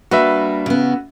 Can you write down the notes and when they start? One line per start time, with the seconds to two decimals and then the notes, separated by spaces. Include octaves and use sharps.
0.11 G3 A#3 D4 F#4 B4 E5
0.66 C#3 B3